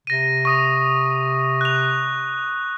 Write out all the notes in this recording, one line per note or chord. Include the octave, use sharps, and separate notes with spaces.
C3 A#6 D#7
C#6 D#6 A#6
F#6 F7